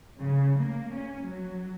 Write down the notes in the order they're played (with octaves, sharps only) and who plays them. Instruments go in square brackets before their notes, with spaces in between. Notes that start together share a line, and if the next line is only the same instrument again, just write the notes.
[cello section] C#3
A#3
C#4
F#3